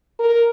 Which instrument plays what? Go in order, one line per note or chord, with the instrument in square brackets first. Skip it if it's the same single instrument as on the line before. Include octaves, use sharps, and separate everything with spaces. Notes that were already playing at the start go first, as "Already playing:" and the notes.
[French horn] A#4